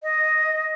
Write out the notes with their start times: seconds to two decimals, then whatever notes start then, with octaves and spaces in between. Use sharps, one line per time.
0.03 D#5